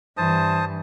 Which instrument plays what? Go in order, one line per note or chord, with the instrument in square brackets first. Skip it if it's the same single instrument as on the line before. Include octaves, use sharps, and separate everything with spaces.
[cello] G2 E3 [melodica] C5 A5 D#6